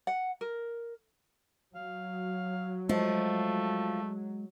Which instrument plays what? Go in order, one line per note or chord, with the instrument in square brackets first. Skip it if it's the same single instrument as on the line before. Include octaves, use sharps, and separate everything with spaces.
[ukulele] F#5
A#4
[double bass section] F#3 [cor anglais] F5
[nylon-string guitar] F3 [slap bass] G#3 [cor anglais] A3